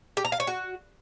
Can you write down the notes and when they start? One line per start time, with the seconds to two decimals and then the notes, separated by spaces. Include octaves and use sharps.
0.17 G4
0.25 A#5
0.32 F5
0.40 C#5
0.47 F#4